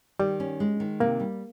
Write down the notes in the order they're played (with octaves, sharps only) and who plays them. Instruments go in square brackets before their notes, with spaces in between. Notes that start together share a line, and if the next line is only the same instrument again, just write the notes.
[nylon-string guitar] D#3 [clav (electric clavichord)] G3
[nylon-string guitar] C#4
G#3
D#3
[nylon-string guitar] C3 [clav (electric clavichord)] A#3
[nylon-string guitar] G3